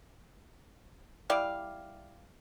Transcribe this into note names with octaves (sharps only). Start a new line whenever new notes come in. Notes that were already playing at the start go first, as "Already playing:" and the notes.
G3 E4 D5 F5